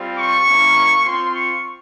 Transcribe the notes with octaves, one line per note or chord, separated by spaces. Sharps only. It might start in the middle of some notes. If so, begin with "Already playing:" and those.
Already playing: G3 C4 F4
C#6
A#3 C#4 E4
C4 F4 C6
C#6